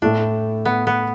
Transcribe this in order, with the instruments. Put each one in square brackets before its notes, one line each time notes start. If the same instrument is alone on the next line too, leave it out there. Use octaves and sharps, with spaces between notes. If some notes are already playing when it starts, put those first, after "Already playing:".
[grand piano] A2 A3 E4 [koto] D4
[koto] B3
B3